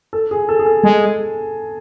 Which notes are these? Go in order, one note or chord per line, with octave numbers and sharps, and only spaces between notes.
A4
G#4
A4
G#4
A4
G#3 G#5